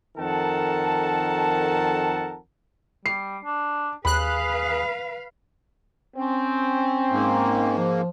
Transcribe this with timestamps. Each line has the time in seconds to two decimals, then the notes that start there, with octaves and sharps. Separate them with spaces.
0.18 F2 D#3 A4 A#4 F#5 A5
3.06 G3 C7
3.44 D4
4.05 D#2 G#4 B4 F5 B5 F#6
6.17 C4 C#4
7.11 G#2 A#3
7.77 F3